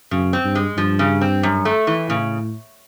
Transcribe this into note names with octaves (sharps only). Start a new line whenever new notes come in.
F#2 C#3
C4
G2
G#3
G2 F3
C#3
C4
F#2
A3
E3
A2 C#3